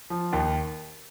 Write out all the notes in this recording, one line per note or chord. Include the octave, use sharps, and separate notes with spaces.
F3
D#2